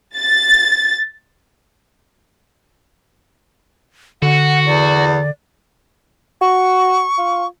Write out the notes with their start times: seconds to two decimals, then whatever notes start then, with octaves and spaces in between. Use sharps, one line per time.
0.18 A6
4.22 D3 F#4 F#5
4.66 E2 D5
6.41 F#4 C#6
7.18 F4